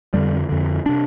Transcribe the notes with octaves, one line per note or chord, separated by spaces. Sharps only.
F2 D3 G3
F2 D3
C3 D4